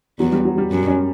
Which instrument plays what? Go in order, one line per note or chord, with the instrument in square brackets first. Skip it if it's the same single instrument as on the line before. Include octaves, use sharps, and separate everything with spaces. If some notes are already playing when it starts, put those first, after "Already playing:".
[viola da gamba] E2 [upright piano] F#3
[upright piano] G3
F#3
G3
[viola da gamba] F#2
[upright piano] C#4